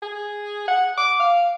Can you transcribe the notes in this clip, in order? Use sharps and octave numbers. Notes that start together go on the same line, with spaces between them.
G#4
F#5
D6
F5